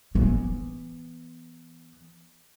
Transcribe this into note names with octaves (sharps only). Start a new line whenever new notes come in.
E3 B3